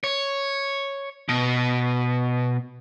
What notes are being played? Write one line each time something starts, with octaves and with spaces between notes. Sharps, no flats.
C#5
B2